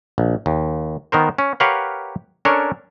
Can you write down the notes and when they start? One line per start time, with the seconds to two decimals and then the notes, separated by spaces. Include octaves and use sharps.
0.18 A#1
0.46 D#2
1.12 D#3 B3 A#4 C5
1.38 C#4
1.60 G4 A#4 B4 C#5 F5 F#5
2.45 C#4 D4 A4 A#4 C#5